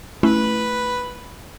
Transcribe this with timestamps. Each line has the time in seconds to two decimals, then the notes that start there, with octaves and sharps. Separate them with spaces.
0.23 A3 C#4 E4 B4